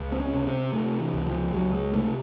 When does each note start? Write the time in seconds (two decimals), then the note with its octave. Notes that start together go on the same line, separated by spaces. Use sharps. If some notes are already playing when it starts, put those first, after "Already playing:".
Already playing: C#2
0.12 C4
0.20 C#4
0.34 C3
0.47 C4
0.73 C3 A3
1.00 E3
1.14 C#2
1.26 F3
1.53 C#2 F#3
1.73 G#3
1.93 C3 A3